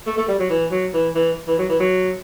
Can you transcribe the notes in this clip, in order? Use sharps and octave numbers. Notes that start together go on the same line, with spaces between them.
A3
A3
G3
F#3
E3
F#3
E3
E3
E3
F#3
E3
F#3